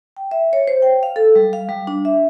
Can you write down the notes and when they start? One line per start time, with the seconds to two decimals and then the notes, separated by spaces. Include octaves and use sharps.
0.17 G5
0.31 E5
0.53 C#5
0.68 C5
0.82 G5
1.03 F5
1.16 A4
1.35 G3
1.53 F5
1.69 G3
1.87 D4
2.05 E5